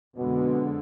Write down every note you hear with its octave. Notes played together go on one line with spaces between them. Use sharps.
F2 B2 D3 G#3 B3